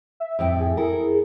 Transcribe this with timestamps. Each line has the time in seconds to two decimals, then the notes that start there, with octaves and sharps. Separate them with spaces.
0.20 E5
0.39 F2 A2 G5
0.60 G#4
0.77 E4 A4 A#4